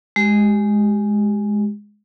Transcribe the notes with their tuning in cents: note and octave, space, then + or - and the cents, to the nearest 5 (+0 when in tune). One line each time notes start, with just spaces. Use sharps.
G#3 +0 G4 -10